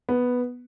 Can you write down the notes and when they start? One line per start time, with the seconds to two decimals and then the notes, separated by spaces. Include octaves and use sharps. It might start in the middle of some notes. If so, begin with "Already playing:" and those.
0.09 B3